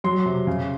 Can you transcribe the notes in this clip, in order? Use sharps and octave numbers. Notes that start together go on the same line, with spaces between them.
F#3 C6
C3
C#3